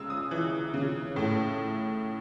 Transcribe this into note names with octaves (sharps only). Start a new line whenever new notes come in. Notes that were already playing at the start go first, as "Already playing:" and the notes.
Already playing: C#3 G#3 D#6 E6
D#6
E3
C#3
A2